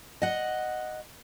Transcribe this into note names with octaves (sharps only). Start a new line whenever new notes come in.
D#5 F#5